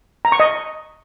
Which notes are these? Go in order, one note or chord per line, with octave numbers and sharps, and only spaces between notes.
A#5
C#6
D#5